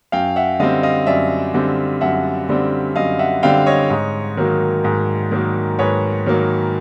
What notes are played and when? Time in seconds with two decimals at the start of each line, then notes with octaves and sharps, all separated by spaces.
0.12 F#2 F5 G5
0.36 E5 F#5
0.60 D3 G3 C4 D#5 F5
0.83 D#5 F5
1.07 F#2 D5 E5
1.54 D3 G3 C4
2.01 F#2 E5 F#5
2.49 D3 G3 C4
2.96 F#2 D#5 F5
3.19 E5 F#5
3.43 D3 G3 C4 F5 G5
3.66 C#5 D#5
3.90 G#2
4.37 D#3 F#3 A#3
4.85 G#2
5.31 D#3 F#3 A#3
5.79 G#2 B4 C#5
6.26 D#3 F#3 A#3